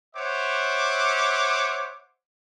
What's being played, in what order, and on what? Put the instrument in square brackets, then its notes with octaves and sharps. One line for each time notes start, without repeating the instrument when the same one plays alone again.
[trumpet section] C5 C#5 E5 F#5 D6